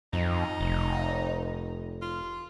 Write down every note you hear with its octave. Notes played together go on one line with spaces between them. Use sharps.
F2 D#4
F1
F4